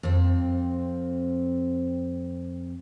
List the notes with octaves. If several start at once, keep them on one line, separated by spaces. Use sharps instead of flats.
F2 C4